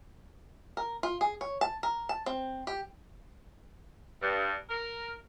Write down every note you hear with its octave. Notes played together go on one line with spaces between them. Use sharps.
A#4
F4
G#4
C#5
A5
A#4
A5
C4
G4
G2
A#4